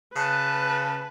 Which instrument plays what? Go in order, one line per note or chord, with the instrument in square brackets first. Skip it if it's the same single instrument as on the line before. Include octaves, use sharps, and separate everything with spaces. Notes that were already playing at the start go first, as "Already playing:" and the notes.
[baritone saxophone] C#3 [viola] B4 [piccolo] A5 [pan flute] F#6